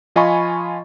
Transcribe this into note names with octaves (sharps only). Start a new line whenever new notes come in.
F3 F4 D#5 G#5 B5 C#6